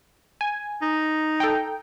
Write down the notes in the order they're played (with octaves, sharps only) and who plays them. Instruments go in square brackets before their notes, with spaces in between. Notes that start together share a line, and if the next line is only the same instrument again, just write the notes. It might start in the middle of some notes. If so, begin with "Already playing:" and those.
[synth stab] G#5
[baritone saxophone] D#4
[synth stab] A4 G5